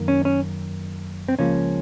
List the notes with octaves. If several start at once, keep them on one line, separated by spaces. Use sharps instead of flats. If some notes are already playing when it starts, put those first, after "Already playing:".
Already playing: F#2 D#3 A#3
C#4
C#4
C4
C#2 C#3 F3 A#3 C#4